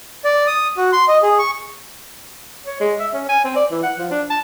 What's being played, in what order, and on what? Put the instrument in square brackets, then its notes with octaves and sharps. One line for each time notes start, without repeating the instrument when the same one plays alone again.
[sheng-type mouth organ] D5
D#6
F#4
C6
D#5
G#4
C#6
[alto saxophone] C#5
G#3
E5
C#4
G#5
C4
D5
E3
F#5
F3
D4
A5